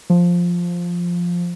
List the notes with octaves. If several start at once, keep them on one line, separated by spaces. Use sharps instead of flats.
F3